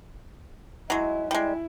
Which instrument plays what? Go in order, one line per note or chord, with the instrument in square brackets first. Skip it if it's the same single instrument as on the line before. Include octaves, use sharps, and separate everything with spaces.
[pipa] F#3 G#3 [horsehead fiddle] E4
[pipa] G3 G#3 [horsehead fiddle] E4